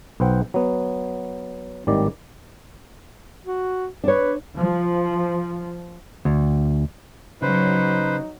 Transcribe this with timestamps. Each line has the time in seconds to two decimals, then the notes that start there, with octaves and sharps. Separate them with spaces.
0.20 B1 B4 C5 F#5 G5
0.54 F#3 B3
1.87 G#1 A2 D#3 G3 D5
3.45 F#4
4.04 D4 B4 C#5
4.57 F3
6.25 D2
7.42 C#3 F#3 D#4 B4 C5